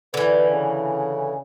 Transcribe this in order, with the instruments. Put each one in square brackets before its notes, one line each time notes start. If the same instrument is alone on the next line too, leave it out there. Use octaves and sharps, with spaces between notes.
[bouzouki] D3 E3 [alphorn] B4
[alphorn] C#3